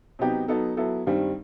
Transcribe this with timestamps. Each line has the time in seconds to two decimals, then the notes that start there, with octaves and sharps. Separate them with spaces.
0.19 C3 F#3 B3 D#4 G4
0.48 F#3 B3 D#4 A4
0.77 F#3 B3 E4 A4
1.06 G2 D#3 G3 C4